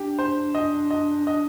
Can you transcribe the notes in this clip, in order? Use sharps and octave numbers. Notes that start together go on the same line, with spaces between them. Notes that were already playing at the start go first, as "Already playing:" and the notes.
Already playing: D4 G4
C5
D#5
D#5
D#5